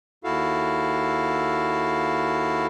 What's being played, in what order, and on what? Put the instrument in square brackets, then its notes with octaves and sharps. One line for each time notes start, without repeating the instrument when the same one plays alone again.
[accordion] D#2 E4 F#4 A4 F5